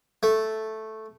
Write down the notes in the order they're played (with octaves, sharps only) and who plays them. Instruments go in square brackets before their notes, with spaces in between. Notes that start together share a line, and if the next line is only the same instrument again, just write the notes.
[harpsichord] A3